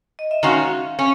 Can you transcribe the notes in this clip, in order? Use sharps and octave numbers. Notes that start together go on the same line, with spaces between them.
D#5
E5
D#3 G#3 C#4 F#4 F5
C#4